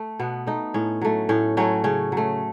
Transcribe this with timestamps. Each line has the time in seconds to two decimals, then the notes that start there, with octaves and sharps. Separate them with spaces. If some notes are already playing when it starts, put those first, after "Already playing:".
Already playing: A3
0.19 B2 B3
0.47 A3 D#4
0.74 A2 C#4
1.01 F#3 A3
1.29 A2 C#4
1.57 F#3 A3 C#4
1.84 C#3 C#4
2.12 F#3 A3